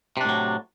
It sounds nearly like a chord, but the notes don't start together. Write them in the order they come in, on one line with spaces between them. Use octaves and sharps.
C3 D4 A2 F#3